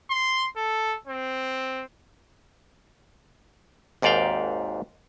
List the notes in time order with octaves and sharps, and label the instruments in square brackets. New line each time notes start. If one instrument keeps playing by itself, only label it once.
[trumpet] C6
A4
C4
[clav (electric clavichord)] G#1 D#2 G#2 D5 F5 G5